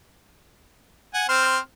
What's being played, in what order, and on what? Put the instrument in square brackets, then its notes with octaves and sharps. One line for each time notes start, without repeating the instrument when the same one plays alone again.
[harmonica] F#5 G#5
C4 C5 F6